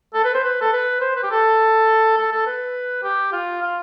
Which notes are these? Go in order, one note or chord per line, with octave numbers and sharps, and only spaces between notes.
A4
B4
C5
B4
A4
B4
C5
B4
G4
A4
A4
A4
B4
G4
F4
F4